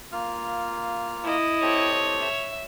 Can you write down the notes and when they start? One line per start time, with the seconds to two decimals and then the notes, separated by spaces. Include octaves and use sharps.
0.12 A#3 F4 F6
1.24 E4 D#5
1.62 C4 G4 A4 C#5
2.20 E5